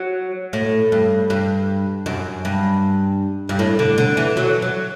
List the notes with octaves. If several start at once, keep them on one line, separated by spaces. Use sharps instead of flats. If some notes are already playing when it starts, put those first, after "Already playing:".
Already playing: F#3
A2
G2
G2
F#2
G2
G2
A2
D3
D3
E3
F#3
F#3